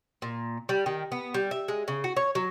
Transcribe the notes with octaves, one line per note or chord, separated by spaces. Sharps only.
A#2
G3
D#3
B3
G3
E5
G#3
C#3
F#4
C#5
F#3